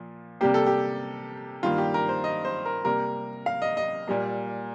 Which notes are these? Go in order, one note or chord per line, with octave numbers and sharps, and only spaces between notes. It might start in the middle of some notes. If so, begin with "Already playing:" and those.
Already playing: A#2 F3
C3 G3 A#3 G4
A4
G4
G2 D#3 G3 A#3 F4
G4
A#4
C5
D#5
C5
A#4
C3 G3 A#3 A#4
F5
D#5
D#5
A#2 G3 A#3